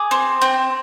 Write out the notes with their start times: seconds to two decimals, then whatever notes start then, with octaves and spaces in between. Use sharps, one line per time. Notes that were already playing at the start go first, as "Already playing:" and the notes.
Already playing: G#4 D6
0.11 C4
0.42 C4